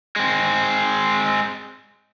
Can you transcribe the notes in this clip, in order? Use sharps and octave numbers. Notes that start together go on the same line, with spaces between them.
G#3 C4